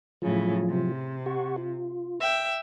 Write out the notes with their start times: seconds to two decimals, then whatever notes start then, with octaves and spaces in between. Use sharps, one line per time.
0.22 A2 C#3 F3 F#3 F4
0.70 C3
1.26 G4 F#5 C#6
1.58 F4
2.20 E5 G5